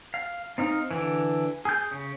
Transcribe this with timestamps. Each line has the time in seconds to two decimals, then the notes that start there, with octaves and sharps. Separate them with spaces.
0.14 F5
0.58 C4 D#4 F5
0.91 D3 E3
1.65 G#4 G6
1.91 C#3